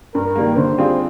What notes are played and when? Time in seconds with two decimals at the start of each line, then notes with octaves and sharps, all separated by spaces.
0.14 G2 A#4
0.36 D#3 G3 A#3
0.57 D3 C5
0.78 G3 C4 F4 G#4